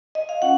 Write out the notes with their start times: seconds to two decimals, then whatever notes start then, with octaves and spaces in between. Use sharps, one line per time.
0.15 D#5
0.29 F5
0.42 C#4 F4 F#5